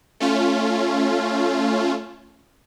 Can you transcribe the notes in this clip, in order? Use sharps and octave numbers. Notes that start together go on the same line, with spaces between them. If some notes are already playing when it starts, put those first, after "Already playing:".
A3 C#4 F4